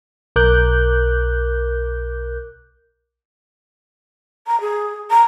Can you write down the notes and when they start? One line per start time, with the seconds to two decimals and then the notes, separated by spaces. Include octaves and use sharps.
0.36 B1 A#4 D6 F#6 G6
4.47 A#5
4.60 G#4
5.10 A#5